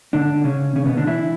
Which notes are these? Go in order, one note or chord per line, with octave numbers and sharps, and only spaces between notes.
D3 D4
C#3 C#4
C#3 C#4
B2 B3
D3 D4
E3 E4